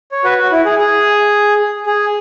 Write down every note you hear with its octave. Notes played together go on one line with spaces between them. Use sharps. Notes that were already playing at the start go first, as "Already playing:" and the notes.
C#5
F#4 B4
F#4
E4
G#4
G#4
G#4